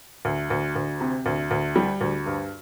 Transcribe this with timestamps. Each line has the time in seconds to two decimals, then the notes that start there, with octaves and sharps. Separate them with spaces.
0.25 D2
0.50 D2
0.76 D2
1.01 C3
1.26 D2
1.51 D2
1.76 G3
2.01 D2
2.26 G2